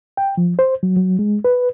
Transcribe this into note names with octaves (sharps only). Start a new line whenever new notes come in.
G5
F3
C5
F#3
F#3
G#3
B4